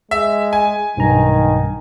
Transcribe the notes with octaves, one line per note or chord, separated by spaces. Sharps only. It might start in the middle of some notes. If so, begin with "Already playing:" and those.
G#3 E5
G#5
B1 G2 D#3 A#5